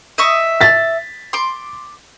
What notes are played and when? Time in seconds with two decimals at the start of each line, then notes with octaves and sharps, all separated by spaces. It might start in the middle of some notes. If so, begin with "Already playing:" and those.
0.18 D#5 E5 C#6
0.61 A6 B6
1.33 C6 D6